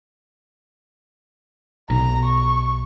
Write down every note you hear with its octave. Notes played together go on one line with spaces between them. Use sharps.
B1 A#5
C#6